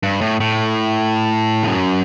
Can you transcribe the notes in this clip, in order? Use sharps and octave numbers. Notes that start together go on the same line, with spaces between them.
G2
A2
A2
E2
F#2